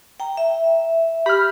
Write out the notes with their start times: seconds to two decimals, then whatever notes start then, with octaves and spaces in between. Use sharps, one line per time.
0.20 G5 A#5
0.37 E5
1.26 G4 B5 F6